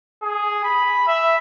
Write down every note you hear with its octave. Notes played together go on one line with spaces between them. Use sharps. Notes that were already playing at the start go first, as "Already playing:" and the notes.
G#4
B5
E5